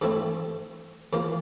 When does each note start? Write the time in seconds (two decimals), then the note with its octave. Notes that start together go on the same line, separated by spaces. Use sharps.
0.01 G2 E3 A3 C4 E4
1.13 E2 E3 A#3 F4